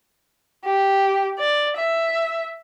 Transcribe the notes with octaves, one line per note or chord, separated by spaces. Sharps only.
G4
D5
E5